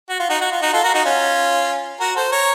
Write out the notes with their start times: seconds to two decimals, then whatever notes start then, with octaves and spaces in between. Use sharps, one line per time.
0.09 F#4
0.20 F4
0.30 D#4 F#4
0.41 F#4
0.52 F4
0.62 D#4 F#4
0.73 F4 A4
0.84 F#4 A#4
0.94 D#4 F#4
1.05 C#4 F4
2.00 F#4 A#4
2.16 A4 C5
2.32 A#4 C#5